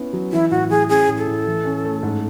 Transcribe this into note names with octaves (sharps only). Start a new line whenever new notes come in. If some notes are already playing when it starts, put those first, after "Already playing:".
Already playing: B3 C#4 E4
F#3
E3 E4
A2 F#4
E3 G#4
C#4 G#4
A2
A4
A2
E3
C#4
A3
G#2